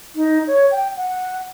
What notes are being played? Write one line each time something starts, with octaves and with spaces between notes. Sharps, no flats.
D#4
C#5
G5
F#5